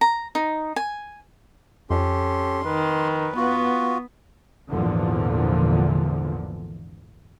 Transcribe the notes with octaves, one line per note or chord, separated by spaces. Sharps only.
A#5
D#4
G#5
F2 C#4 G4 A4 C6
D#3 B4
B3 F4 F#4
G#1 E2 A#2 D3 E3 F3